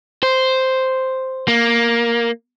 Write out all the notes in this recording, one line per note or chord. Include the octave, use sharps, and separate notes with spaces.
C5
A#3